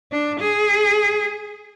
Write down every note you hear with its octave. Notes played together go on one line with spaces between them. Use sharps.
D4
G#4